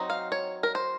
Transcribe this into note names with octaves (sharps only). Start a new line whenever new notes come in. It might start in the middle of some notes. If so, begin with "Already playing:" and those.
Already playing: F#3 C4 D#4
F5
C#5
A#4
C5